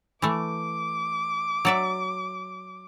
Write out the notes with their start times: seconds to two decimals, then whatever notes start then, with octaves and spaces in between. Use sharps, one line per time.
0.22 E3 A3 D6
1.65 F#3 D5 E5